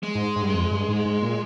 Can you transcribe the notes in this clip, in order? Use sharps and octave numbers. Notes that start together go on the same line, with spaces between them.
G#3
G#2
G#2
G2
F2
G2
G#2
G#2
A#2